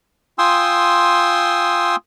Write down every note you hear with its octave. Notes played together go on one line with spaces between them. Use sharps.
F4 G5 G#5 C6 D#6 E6